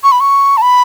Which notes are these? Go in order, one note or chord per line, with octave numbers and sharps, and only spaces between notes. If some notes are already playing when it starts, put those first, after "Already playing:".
C#6
B5
C#6
A5
B5